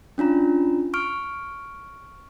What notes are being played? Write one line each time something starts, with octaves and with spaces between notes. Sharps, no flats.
C#4 D4 F4 A#5
C#6 F6 D7